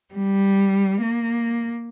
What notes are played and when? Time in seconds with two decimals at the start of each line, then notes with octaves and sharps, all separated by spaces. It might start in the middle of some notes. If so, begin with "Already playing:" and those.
0.13 G3
1.00 A#3